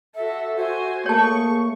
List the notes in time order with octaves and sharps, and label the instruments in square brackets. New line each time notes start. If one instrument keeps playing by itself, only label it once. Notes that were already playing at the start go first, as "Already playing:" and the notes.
[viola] F#4 A4 [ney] E5
[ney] F#4 [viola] C5 G#5
[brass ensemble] A3 A#3 [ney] G#4 [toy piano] C#5 A5 [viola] C#6